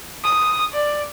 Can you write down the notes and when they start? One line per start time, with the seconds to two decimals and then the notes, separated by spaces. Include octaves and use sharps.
0.24 D#6
0.73 D5